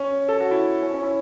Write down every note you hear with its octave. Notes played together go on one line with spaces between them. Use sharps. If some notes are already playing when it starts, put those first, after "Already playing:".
Already playing: C#4
A4
F#4
E4
C#4
C#4
E4